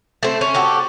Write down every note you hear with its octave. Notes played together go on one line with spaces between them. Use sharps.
A3 C4
C#4
F#4 G4 A4